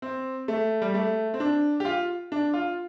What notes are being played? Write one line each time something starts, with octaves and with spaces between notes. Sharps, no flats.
C4
A3
G3
A3
C4
D4
G4
F4
D4
F4